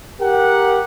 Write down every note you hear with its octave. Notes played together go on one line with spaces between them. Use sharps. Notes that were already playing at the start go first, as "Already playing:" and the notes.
G4 A#4 F#5